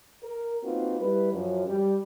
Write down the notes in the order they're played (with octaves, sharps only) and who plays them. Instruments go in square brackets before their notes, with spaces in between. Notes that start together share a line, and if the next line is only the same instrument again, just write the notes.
[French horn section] A#4
A#3 C4 D#4 F4 F#4 B4
G3 E4 B4
F#2 F3 F#3
G3